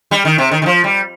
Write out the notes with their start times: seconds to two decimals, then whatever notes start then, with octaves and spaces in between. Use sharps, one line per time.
0.11 G3
0.25 D#3
0.38 C3
0.51 D#3
0.62 D#3
0.66 F3
0.84 G3